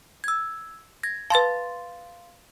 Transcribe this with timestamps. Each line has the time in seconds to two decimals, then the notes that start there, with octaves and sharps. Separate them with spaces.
0.24 E6 G#6
1.03 G#6 A#6
1.30 B4 F5 A5 C6 A6